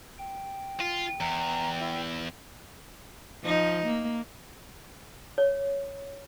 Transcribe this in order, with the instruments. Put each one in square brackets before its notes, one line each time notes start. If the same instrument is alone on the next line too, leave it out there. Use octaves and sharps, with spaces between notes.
[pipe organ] G5
[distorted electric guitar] F4
[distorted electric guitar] E2 [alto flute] A#5
[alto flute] E4
[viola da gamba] F3 D#4
A#3
[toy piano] C#5